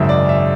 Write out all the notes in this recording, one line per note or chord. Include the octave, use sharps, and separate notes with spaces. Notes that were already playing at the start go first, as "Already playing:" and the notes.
Already playing: G#1 F#2 C#3 G#3 E5
D5
E5